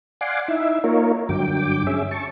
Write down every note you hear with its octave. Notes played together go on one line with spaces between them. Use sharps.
D5 F5 F#5 G#5 C6 D6
D#4 E4 E5
A#3 D#4 F4 A#4 C#5
G2 D3 F#3 G5 D6
C#4 G#4 E5
A5 C#6